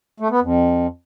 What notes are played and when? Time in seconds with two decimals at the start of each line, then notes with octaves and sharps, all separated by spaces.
0.20 A3
0.31 B3
0.41 F2